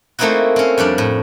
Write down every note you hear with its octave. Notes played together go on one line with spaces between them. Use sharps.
A3 A#3 C4 D#4 E4 F#4
C4 C#4
F2 G3 D4 D5
A2